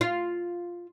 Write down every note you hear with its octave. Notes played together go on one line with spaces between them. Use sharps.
F4